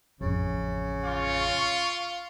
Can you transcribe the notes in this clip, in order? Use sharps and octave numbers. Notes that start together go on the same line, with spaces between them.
A1 F2 C#3
F4 F5 C#6